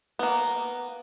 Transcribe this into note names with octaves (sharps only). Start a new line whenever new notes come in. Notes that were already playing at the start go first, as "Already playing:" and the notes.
A#3 B3